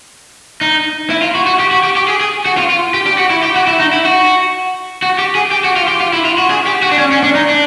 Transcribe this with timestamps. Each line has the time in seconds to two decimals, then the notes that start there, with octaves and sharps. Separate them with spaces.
0.61 D#4
1.10 E4
1.22 F4
1.35 F#4
1.47 F#4
1.60 G4
1.71 F#4
1.84 G4
1.96 G4
2.08 G#4
2.21 G#4
2.46 F#4
2.57 F4
2.70 F4
2.94 G4
3.07 G4
3.18 F#4
3.30 E4
3.43 G4
3.56 F#4
3.67 E4
3.80 D#4
3.93 E4
4.05 F#4
5.02 F#4
5.18 G4
5.35 G#4
5.51 G4
5.64 F#4
5.76 F4
5.88 G4
6.01 F4
6.13 E4
6.25 F4
6.38 F#4
6.50 G#4
6.67 G4
6.83 F#4
6.92 D4
6.98 C#4
7.12 C#4
7.23 D4
7.35 D#4
7.49 D4